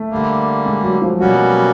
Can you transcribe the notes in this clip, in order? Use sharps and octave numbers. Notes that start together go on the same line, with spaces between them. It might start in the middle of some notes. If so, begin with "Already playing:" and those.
Already playing: A3
D3 G3 A#3
G#3
F#3
F3
B2 F#3 G3 A#3 C#4 F#4